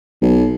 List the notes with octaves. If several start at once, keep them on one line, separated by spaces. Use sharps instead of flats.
B1